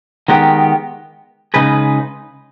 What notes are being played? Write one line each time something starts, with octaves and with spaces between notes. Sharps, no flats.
D#3 G#3 B3 G4
C#3 G#3 D#4 G#4 B4